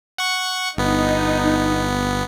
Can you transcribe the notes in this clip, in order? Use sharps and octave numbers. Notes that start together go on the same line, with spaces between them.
F#5 C#6
G1 B3 D#4